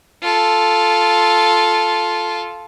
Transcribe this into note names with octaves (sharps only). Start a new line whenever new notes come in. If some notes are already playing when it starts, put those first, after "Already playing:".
F4 A4